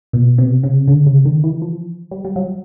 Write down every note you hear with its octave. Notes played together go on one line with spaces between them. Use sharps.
B2
C3
C#3
D3
C#3
D#3
E3
F3
G3
G3
F#3